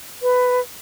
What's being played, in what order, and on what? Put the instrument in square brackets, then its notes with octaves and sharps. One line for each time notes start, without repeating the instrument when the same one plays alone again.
[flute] B4